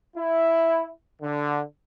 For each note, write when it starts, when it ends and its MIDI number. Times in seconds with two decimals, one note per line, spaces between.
0.17 0.90 64
1.22 1.61 50